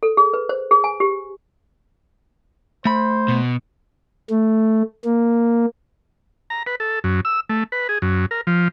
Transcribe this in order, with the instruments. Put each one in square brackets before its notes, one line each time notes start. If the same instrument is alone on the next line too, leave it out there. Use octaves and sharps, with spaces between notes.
[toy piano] A4
G#4
B4
C5
G#4
G#5
G4
[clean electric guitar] A3 B5 [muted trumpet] C5
[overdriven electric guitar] B2
[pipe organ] A3
A#3
[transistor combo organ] A#5
B4
A4
F#2
E6
A3
B4
G#4
F#2
A#4
F3